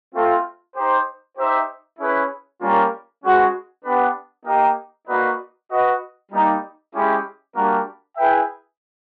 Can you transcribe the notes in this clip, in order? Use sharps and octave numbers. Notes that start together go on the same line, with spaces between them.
A3 C4 F4
D#4 G4 C5
D#4 G4 C5 E5
C#4 E4 G#4 B4
G3 A#3 C#4 F4 A#4
G#3 C#4 F#4 B4
B3 D4 G4 B4
A#3 D#4 G4 A#4 D#5
A#3 D#4 F#4 B4 D5
F#4 B4 D#5
G3 A#3 D#4 G4
G#3 C#4 E4 G4
G3 A#3 D4 F#4 A#4
E4 G#4 B4 E5 G5